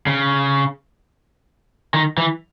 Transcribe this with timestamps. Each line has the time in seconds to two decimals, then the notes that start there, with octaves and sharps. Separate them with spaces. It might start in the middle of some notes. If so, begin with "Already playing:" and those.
0.07 C#3
1.94 D#3
2.18 E3